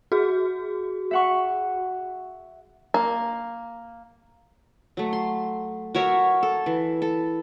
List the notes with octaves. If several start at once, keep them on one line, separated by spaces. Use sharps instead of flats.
F#4 G#4
E5 F#5 C#6
A#3
F#3 A3
C6
F#4 A#4 C#5 E5
A4
E3
A4